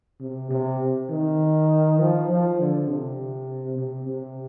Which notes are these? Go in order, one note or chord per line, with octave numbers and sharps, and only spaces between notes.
C3
C3
D#3
F3
F3
D3
C3
C3
C3